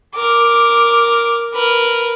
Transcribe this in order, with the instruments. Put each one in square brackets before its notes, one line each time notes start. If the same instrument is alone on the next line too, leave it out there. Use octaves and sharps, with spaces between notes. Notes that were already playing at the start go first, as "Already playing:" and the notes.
[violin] A#4 D6
A#4 B4